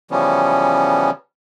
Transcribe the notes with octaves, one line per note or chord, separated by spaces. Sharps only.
C#3 E3 F3 G3 B3 C#4